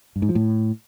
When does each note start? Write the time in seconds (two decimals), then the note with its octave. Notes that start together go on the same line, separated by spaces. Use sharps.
0.16 G2
0.22 G#2
0.29 F3
0.35 A2